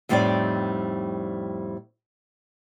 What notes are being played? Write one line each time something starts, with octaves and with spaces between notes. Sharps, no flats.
F2 A2 G3 C4 D#4 D5